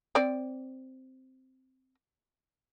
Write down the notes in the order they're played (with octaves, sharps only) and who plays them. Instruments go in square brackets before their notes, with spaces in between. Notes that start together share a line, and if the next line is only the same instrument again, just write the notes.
[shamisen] C4 D5